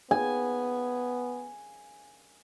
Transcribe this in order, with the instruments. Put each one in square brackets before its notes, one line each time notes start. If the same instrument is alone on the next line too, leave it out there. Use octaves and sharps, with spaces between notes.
[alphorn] B3 [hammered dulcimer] G#5